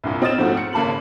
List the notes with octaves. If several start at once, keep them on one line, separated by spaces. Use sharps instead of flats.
C2 G2 A#2
C4 D#5 D#6 F6 A6 E7
G#2 F3 A3 C4 F#4
C#7
G#1 C#3 A#3 A5 B5 F#7